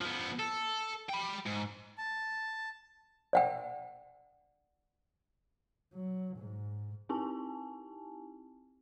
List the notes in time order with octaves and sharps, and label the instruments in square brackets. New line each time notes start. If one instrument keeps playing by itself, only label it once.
[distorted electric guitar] F3 B3
A4
G5 B5
G#2
[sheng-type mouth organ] A5
[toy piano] D5 F#5 G5
[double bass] F#3
G#2
[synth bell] C4 D#4 E4 G4 G#5 A5